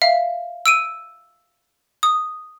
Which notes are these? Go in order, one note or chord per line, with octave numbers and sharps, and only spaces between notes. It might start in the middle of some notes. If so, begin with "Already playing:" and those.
E5 F5
E6 D7 D#7
D#6